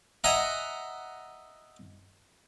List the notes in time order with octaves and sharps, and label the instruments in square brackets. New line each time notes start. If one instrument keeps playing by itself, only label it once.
[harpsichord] D#5 E5 F#5 G#5 A#5